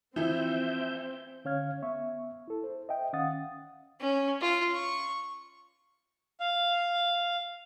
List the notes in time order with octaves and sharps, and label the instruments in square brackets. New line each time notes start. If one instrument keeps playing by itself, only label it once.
[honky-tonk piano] E3 F3 E4 [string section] C4 [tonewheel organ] E5 G6
[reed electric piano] D3 C#4 C#5 F5 F6 G#6
B3 E5 C#6
E4 A4
C5
D#5 E5 G5
D#3 C#4 F5 F#5 D#6 A6
[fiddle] C#4
F4
C#6
[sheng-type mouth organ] F5